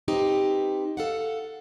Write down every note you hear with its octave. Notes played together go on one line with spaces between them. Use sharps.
C4 D#4 G4 B4
A4 F5 F#5